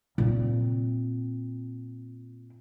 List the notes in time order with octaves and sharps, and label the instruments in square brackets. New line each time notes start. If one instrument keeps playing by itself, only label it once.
[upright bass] A#2 C4